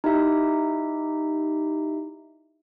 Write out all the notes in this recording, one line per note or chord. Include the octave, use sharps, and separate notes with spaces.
D#4 E4 G4 E5